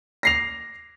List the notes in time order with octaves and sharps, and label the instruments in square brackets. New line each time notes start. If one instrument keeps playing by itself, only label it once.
[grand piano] A#6 C7 F7